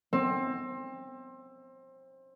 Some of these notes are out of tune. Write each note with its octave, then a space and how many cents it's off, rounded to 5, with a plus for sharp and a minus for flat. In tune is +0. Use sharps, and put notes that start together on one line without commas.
C4 +25